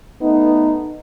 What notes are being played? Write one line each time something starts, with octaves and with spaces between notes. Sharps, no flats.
A3 B3 D#4